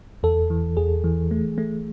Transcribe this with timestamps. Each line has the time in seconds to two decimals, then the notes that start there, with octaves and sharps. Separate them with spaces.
0.23 E2 A4
0.50 E3
0.77 E2 G#4
1.04 E3
1.31 A3
1.58 A3